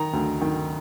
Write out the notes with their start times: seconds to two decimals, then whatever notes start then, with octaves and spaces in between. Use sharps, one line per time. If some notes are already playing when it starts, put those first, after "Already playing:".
Already playing: D#3 A#5
0.13 D2
0.41 D#3